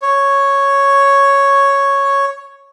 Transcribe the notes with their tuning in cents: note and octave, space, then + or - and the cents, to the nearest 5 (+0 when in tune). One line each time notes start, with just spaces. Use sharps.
C#5 +0